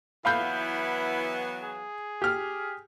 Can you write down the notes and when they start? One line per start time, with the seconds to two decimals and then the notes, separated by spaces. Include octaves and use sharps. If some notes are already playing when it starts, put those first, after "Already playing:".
0.25 E3 F#3 B3 E4 F5 B5 G6
1.62 G#4
2.22 G4 F6